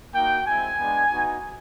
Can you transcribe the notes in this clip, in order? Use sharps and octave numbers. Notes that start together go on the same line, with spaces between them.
A#3 D#4 F#4 G5
G#3 C4 E4 G#5
G#3 B3 D4
B3 D#4 F#4